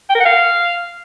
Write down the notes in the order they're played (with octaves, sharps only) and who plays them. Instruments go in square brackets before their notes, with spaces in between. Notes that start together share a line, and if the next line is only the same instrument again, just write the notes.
[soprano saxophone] G5
A#4
F#5
F5